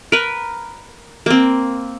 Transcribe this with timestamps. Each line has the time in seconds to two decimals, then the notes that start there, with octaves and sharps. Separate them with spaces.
0.12 A#4 B4
1.26 A#3 C4